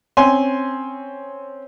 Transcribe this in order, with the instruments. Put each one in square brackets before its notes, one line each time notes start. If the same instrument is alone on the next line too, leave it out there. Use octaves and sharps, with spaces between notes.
[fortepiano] C4 C#4 G#5 C6